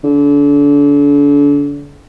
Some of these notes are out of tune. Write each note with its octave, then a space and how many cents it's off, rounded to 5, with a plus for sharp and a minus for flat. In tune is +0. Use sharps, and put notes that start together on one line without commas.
D3 -35